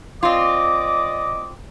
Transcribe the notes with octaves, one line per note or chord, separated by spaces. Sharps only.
C4 F4 D5 D#5 D6